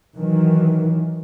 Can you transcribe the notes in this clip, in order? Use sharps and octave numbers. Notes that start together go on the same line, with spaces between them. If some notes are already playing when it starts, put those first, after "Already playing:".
D#3 E3 F#3